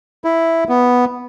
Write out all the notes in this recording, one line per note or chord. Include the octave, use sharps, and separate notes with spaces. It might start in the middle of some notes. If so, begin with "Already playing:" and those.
E4
B3